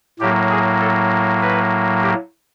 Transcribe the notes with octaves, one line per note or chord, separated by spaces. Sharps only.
A2 F#3 A#3 G4
G#4
A4
B4
G4